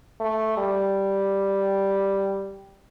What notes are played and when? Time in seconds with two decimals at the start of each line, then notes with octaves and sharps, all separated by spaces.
0.20 A3
0.58 G3